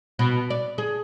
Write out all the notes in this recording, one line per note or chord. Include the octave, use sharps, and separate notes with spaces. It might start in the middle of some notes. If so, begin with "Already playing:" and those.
B2
D5
G#4